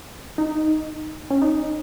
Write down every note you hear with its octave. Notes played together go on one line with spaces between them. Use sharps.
D#4
C#4
D#4